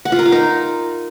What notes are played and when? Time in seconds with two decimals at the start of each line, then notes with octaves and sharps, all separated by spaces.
0.05 F#5
0.12 F4
0.19 A#4
0.26 F5
0.32 D#4